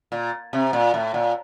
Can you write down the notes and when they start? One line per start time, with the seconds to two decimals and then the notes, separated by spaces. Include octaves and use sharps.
0.12 A#2
0.53 C3
0.73 A#2
0.94 A2
1.14 A#2